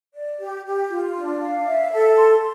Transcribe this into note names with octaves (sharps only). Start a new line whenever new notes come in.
D5
G4
G4
F4
D4
F5
E5
A4
C6